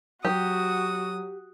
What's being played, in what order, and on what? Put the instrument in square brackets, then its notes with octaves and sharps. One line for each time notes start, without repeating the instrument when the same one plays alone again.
[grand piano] F#3 [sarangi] F#4 [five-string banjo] G4 [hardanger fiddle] D#6